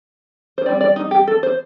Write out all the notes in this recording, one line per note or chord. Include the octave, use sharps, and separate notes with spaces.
C5
G3 C4 D#4 D5
D5
D#4
G4
A4
C5